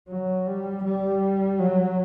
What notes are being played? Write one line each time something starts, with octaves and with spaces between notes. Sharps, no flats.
F#3
G3
G3
F#3